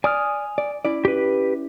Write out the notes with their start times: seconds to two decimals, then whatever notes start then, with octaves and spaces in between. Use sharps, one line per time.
0.04 D5 G#5 D#6 F6
0.58 D5
0.85 C#4 E4 D5
1.05 G4 B4